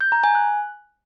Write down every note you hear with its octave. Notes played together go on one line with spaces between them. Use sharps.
G6
A#5
G#5
F#6